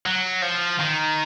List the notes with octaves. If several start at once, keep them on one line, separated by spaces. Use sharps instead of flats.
F#3
F3
D#3